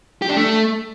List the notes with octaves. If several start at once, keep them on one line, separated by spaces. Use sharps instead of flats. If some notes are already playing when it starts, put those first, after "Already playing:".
G4
D4
A3